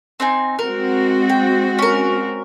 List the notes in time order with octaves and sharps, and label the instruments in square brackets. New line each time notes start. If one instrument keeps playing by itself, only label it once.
[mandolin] C4 D#4 G#5
[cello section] G#3 C4 F#4 [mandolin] A#4
[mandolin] G5
C#4 A#4